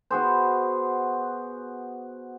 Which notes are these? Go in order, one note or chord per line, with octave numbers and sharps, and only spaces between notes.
B3 F#4 G#4 C5